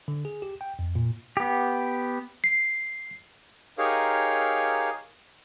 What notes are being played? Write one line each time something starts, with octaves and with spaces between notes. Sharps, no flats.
D3
G#4
G4
G5
F2
A#2
B3 G4
C7
D#4 G4 G#4 A#4 C#5 F5